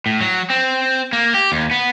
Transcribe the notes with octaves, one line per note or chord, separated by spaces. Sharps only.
A2
F#3
C4
A#3
G4
D#2
B3